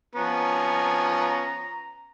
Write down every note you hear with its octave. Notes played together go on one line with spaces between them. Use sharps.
F3 B3 C#4 A#5